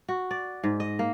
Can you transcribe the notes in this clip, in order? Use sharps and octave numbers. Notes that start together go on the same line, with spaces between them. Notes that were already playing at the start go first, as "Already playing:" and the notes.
F#4
D5
G#2
D#5
A#3